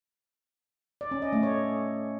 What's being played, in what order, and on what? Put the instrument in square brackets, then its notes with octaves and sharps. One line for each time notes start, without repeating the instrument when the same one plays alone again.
[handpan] D5
C#4
D#5
A3
C#5